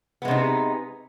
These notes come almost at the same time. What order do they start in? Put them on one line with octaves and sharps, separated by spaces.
B3 G#3 C3 D#4